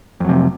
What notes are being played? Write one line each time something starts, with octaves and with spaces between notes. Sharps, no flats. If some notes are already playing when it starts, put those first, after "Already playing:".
F2 C3 F#3